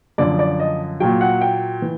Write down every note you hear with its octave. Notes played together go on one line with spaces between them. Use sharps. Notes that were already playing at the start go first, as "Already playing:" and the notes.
F#2 D3 F3 D5
D5
D#5
A#2 F#3 G5
F#5
G5
E3